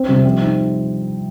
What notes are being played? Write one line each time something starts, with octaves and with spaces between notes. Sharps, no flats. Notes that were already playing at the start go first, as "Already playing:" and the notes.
Already playing: C4
C3 G3
F3 C4
D#4